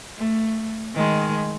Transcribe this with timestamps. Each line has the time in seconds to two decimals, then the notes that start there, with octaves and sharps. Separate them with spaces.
0.17 A3
0.95 D#3 G#3